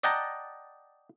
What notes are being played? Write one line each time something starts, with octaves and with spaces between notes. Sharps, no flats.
D5 D#5 F#5 G5 A5 A#5